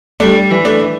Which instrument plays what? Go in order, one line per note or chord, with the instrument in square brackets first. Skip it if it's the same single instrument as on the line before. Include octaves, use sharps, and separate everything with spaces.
[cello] G3 [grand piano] A3 D4
[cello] E3
[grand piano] A3 D4